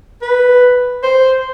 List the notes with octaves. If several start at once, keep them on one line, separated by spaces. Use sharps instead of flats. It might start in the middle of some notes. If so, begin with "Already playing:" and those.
B4
C5